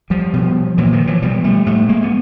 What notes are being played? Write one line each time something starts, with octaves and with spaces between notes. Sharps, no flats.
F3 G3
B2
A#2 E3 F#3
D#3 F3
E3 F#3
B2 F3 G3
G3 A3
A2 G3 A3
G#3 A#3
B3